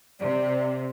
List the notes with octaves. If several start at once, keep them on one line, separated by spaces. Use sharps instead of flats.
C3 D5